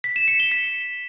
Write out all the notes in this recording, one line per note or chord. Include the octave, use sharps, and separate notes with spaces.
B6
E7
C#7
G7
B6